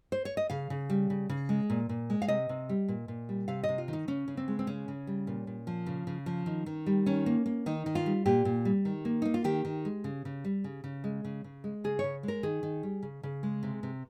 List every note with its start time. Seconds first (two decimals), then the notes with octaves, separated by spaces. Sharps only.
0.12 C5
0.25 C#5
0.37 D#5
0.50 C#3 F5
0.70 C#3
0.90 G3
1.10 C#3
1.29 C#3
1.49 G#3
1.70 A#2
1.89 A#2
2.10 G#3
2.22 F5
2.28 C3 D#5
2.49 C3
2.69 G3
2.88 A#2
3.08 A#2
3.29 G3
3.48 C3 F5
3.63 D#5
3.69 C3
3.78 F4
3.88 D#3
3.93 D#4
4.08 C#3 C#4
4.28 C#3
4.37 C4
4.48 G#3
4.59 C4
4.67 C#3 C#4
4.88 C#3
5.07 G3
5.27 A#2
5.47 A#2
5.67 F3
5.86 C#3
6.07 C#3
6.26 F3
6.46 D#3
6.66 D#3
6.86 G3
7.06 D#3 C#4
7.26 A#3
7.46 A#3
7.66 D#3 D#4
7.86 D#3
7.95 F4
8.06 G3
8.26 A#2 G4
8.45 A#2
8.65 G3
8.85 D#3
9.05 A#3
9.22 A#3 D#4
9.34 F4
9.44 D#3 G4
9.65 D#3
9.85 G#3
10.04 C#3
10.25 C#3
10.45 G3
10.64 C#3
10.84 C#3
11.04 G#3
11.24 C#3
11.44 C#3
11.64 G#3
11.84 C#3 G#4
11.99 C#3 C#5
12.23 G#3
12.28 A#4
12.43 D#3 G#4
12.63 D#3
12.83 G3
13.03 C#3
13.23 C#3
13.43 G#3
13.63 C3
13.83 C3